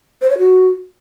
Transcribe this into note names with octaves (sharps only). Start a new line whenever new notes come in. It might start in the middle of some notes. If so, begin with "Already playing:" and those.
C5
C#5
F#4